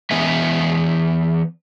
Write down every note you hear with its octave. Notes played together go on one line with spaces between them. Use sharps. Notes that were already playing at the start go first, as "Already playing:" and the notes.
E3 B3 B4 D#5 E5 G#5